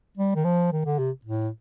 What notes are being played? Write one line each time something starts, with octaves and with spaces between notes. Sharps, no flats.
G3
D#3
F3
D#3
D3
C3
A2